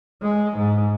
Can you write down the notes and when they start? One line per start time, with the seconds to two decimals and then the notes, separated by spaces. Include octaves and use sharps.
0.23 G#3
0.57 G#2